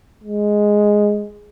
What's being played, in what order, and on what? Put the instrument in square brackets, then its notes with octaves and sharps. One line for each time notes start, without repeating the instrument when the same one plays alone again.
[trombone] G#3